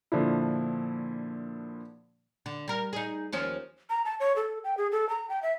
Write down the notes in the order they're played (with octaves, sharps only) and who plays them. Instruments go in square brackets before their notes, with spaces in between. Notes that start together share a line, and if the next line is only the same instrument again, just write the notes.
[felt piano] A#2 D3 F3 D4 E4
[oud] D3
G3 A#4
D#4 G#4
D#2 F3 C#4
[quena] A#5
A5
C#5
A4
G5
G#4
A4
A#5
G5
E5